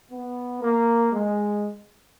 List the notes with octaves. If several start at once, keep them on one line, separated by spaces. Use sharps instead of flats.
B3
A#3
G#3